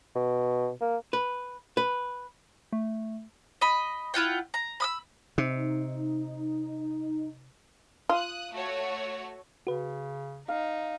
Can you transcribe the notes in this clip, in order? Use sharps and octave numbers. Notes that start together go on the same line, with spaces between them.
B2
A#3
B4
B4
A3
D#5 B5
E4 F4 F#5 G5
A#5
B5 D#6 E6
C3 D#4
F4 D#6 F#6
A3 F#4 C#5
C#3 F#4 B4
D#4 F5